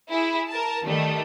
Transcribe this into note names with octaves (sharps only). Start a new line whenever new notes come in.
E4 G#4
A#4 A5
D#3 G3 A3